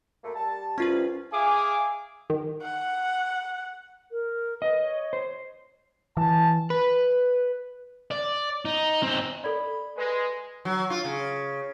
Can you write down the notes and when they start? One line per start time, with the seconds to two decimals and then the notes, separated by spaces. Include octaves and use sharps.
0.24 F#2 A3 A#3
0.35 G3 A5
0.78 C2 C#4 F4 B4
1.33 G#4 E5 F5 G#5 D6
2.30 D#3
2.62 F#5
4.10 A#4
4.62 B4 D#5
4.81 C#5
5.13 C5
6.17 E3 A5
6.70 B4
8.11 D5
8.65 D#4
9.03 C4 D#4
9.44 A4 D5 B5
9.97 G#3 B4
10.65 F#3
10.90 F4
11.04 C#3